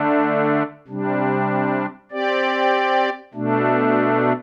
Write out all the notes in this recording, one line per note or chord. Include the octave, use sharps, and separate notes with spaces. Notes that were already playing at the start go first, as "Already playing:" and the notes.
Already playing: D3 A3 D4
C3 G3 D4
C4 G4 D5
B2 A3 D4